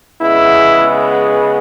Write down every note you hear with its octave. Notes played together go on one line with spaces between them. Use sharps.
C#3 G#3 B3 E4